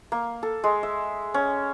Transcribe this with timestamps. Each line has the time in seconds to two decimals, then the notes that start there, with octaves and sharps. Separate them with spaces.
0.12 A#3
0.43 A4
0.64 G#3
0.83 E5
1.34 C#4